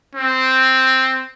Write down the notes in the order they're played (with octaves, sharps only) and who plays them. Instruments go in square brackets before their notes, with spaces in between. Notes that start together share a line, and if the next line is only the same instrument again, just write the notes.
[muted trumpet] C4